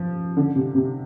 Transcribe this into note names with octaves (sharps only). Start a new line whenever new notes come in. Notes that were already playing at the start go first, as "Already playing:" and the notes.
Already playing: F3
D3
C3
C3